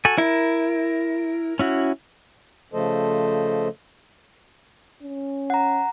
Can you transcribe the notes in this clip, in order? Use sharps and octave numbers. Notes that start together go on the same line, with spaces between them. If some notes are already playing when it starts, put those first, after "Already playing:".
F#4 A4 G#5
E4 A#4
C#4 E4 F#4
C#3 F3 A3 A4 C5 D#5
C#4
F#5 A#5